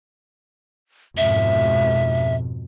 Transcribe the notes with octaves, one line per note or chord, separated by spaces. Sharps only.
F2 G#2 B2 E5